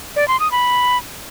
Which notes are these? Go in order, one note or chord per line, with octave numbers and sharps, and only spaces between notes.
D5
C6
D#6
B5